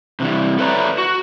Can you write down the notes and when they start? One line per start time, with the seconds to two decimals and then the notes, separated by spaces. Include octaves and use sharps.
0.20 C3 E3 G3
0.59 A4 B4 C#5 D5 E5 A#5
0.98 F#4